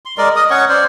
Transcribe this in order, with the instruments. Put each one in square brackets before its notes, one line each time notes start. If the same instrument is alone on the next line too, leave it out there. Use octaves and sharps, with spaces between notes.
[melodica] C6
G#3 A#4 D5
D#5 D#6
C#4 C#5 F#5 C#6
C5 D5